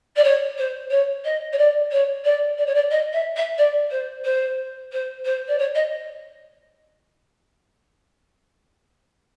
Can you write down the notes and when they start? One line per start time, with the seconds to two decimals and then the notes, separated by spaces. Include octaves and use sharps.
0.16 D5
0.23 C#5
0.58 C5
0.90 C#5
1.24 D#5
1.52 C#5
1.58 D5
1.91 C#5
2.24 D5
2.58 D5
2.66 C#5
2.74 D5
2.90 D#5
3.13 E5
3.36 E5
3.58 D5
3.90 C5
4.24 C5
4.92 C5
5.24 C5
5.47 D5
5.58 C#5
5.75 D#5